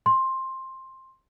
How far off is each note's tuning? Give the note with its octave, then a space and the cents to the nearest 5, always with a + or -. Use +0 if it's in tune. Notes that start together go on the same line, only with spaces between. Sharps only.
C6 +10